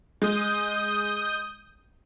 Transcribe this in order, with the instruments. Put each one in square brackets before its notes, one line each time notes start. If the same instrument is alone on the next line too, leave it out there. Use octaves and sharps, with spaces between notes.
[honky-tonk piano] G#3 [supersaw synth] D#6 G6